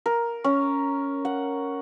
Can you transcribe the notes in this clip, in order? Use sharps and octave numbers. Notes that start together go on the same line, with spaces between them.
A#4
C#4
F#5